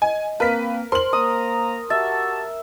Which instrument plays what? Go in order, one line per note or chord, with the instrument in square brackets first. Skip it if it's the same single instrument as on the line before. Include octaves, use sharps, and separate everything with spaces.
[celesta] D#5 [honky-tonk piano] G#5
[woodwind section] A#3 C4 [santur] A#4 [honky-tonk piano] B4 B6 [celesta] F5
[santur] A#4 [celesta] C5 [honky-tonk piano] C6 F#7
[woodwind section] A#3 A#5 [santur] D#6
[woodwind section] F#4 G4 A5 [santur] E5 [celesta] A6